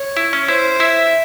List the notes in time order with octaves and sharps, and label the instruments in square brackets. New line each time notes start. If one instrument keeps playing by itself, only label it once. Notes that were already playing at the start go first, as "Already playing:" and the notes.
Already playing: [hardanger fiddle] C#5
[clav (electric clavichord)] E4
C#4
[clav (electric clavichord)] E4 [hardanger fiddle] C5
[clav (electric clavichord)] E4 [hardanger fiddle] E5